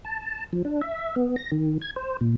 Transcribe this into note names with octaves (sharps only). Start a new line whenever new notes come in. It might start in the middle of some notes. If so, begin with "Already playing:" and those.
A5
F3
D4
E5
B3
A#6
D#3
G#6
C5
A#2